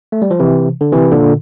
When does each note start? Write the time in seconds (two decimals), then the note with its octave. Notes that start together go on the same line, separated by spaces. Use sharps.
0.12 A3
0.22 G3
0.31 F3
0.39 C3 E3
0.81 D3
0.92 C3 E3
1.12 A#2 D3